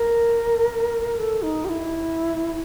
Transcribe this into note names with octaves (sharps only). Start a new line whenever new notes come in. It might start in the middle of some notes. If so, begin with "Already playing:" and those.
Already playing: A#4
A4
D#4
G4
E4